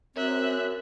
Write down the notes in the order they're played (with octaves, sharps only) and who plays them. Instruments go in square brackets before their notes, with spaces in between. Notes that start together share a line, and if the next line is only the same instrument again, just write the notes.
[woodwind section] F#2 [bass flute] C4 [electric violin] E5 F#6